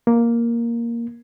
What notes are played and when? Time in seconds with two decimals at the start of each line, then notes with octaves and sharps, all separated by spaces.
0.07 A#3